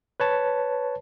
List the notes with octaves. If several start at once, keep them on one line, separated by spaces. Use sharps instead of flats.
B4 C#5 A5